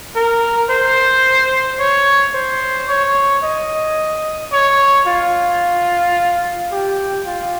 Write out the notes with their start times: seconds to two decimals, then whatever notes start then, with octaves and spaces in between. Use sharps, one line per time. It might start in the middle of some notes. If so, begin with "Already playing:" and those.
0.16 A#4
0.70 C5
1.80 C#5
2.34 C5
2.89 C#5
3.44 D#5
4.52 C#5
5.07 F4
6.72 G4
7.27 F4